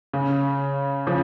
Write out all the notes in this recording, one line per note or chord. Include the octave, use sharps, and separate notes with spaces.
C#3
C#3 F3